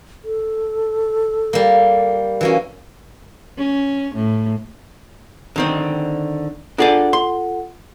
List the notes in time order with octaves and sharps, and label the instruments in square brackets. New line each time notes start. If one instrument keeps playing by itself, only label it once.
[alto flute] A4
[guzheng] G3 A#3
[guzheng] E3 A#3 C#4 [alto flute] F#4
[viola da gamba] C#4
A2
[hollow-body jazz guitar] D3 D#3 C4
[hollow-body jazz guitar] D4 G#4 D5 [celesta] F4 A4 F#5
[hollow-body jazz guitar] C6